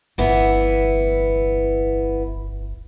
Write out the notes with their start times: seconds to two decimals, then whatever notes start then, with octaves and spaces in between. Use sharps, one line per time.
0.18 D1 G1 E3 B3 E4